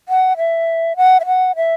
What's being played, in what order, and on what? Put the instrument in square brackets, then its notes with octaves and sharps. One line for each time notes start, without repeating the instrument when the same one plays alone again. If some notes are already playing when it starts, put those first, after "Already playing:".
[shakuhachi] F#5
E5
F#5
E5
F#5
E5